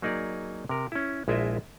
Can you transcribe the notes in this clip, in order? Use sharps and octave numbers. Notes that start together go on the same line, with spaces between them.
F#3 A#3 D#4 G#4 D5
C3 A#4
C#4 E4
A#1 G#3 E4 F4 D#5 E5